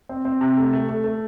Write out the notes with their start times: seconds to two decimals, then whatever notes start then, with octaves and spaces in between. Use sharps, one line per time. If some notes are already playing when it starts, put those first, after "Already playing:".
0.09 C4
0.25 C4
0.41 C3
0.57 A3
0.73 A3
0.89 A3
1.04 A3